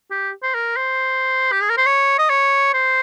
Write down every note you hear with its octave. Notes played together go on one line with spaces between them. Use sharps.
G4
C5
A#4
C5
G4
G#4
A#4
C5
C#5
D#5
C#5
C5